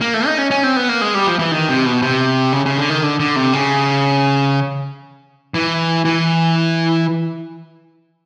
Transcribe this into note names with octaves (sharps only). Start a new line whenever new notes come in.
A#3
A3
D#4
C#4
C#4
C4
B3
A#3
G#3
G3
F3
E3
D#3
C3
B2
C3
C#3
C#3
D3
D#3
D3
D3
C3
C#3
E3
E3